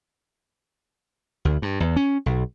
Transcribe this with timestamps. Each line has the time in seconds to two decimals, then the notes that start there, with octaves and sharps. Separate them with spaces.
1.45 D2
1.62 G2
1.80 E2
1.96 C#4
2.26 B1